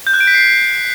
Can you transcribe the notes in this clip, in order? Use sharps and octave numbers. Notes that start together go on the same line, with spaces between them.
G6
F#6
D7
B6
C7